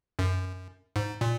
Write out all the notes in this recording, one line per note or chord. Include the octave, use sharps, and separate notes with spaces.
F#2
G#2
A#2